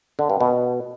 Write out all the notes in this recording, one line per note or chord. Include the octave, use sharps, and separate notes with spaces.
D3
G2
B2